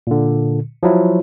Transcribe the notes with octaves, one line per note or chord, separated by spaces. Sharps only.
A#2 D3
F3 F#3 E4